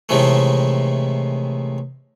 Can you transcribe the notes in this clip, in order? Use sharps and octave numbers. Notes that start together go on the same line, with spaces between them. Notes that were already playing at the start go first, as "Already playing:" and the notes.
A2 C3 D#3 E3 G#3 A3